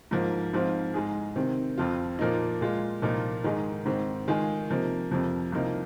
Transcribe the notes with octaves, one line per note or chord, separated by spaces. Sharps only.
G#2 F3 A#3
G#2 F3 C4 F4
G#2 G#3 D#4 G#4
C3 D#3 C4
F2 F3 C4 F4
A#2 F3 A#3 D#4
A#2 G#3 F4
C2 A#2 F3 A#3 D#4
G#2 D#3 G#3 D#4 G#4
G#2 D#3 C4
D#3 G#3 F4 G#4
C3 F3 A#3 D#4
F2 C3 F3 A#3
C2 C3 F3 A#3 D#4